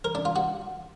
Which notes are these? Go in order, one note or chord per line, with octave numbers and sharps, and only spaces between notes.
A#4
D4
F4
F#4